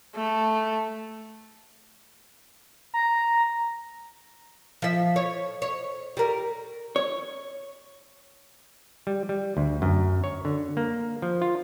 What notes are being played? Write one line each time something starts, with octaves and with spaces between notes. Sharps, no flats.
A3
A#5
F3 E5
C#5
C#5
G3 A#4
C#5
G3
G3
D2
F#2
C#5
D3
A#3
F3
F4